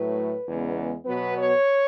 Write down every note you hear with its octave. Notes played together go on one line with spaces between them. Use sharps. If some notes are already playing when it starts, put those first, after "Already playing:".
Already playing: A2 F#3 A3 B4
E2 C#3 G#3 B3
B2 F#3 B3 B4
C#5